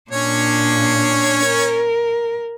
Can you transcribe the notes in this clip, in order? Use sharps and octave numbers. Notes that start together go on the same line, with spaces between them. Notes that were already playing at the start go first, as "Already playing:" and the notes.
A#2 C#4 D4 C#5
A#4